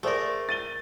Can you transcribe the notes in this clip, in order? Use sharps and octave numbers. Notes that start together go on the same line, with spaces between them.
A3 G#4 A#4 C5 D5
A6 D#7 G7